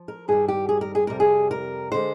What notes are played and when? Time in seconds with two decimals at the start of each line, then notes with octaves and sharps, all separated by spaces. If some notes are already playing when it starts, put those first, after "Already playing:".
Already playing: F3
0.08 A#4
0.28 G2 D#3 G3 G#4
0.48 G4
0.69 G#4
0.81 A#4
0.95 G#4
1.07 F2 C3 G3 A#4
1.20 G#4
1.51 A#4
1.92 D3 G#3 C5